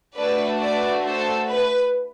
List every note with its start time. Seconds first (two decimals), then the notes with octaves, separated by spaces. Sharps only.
0.16 A3 D4 F#4 A4 B4 D5
0.59 B4 D5
1.03 A4 C5
1.46 B4